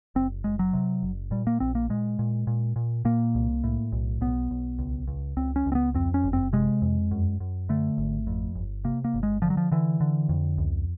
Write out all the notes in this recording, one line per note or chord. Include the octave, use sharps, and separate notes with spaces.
F#1 C4
F#1 G#3
F#3
C3
F#1
A#2 G3
A#3
A#1 C4
A#3
A#2 G#3
A#2
A#2
A#2
A#2 A#3
C2
A2
B1
B1 B3
B1
C#2
C#2
C#2 C4
C#4
C#2
C4
B3
F2 C4
C#4
F#1
C4
C3 G#3
F2
F#2
F#2
D3 A3
G#1
F2
G1
C3 A#3
A#3
G1
G#3
D3 F3
F#3
F3
D3 E3
D3
F2
C#2